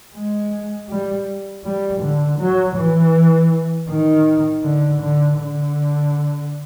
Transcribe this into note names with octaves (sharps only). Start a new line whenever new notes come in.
G#3
G3
G3
D3
F#3
E3
D#3
D3
D3
D3